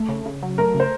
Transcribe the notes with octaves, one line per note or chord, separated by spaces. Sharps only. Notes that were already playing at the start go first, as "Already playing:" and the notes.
Already playing: A3
C#3
C#3
F#3
A3 A#4
C#3
C5